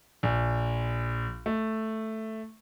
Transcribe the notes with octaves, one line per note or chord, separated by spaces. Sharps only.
A#1
A3